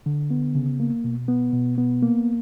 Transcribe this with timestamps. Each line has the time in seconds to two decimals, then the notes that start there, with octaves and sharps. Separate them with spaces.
0.06 D3
0.30 B3
0.55 C#3
0.80 A#3
1.04 B2
1.28 B3
1.53 B2
1.78 B3
2.02 A#3